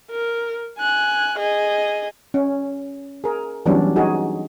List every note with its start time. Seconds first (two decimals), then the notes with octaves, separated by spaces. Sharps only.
0.11 A#4
0.79 G#5 F#6
1.39 G#4 D#5
2.34 C#4
3.24 G#4 A#4
3.66 E3 F#3 G3 B3 C#4 D4
3.96 D#4 F#4 G#4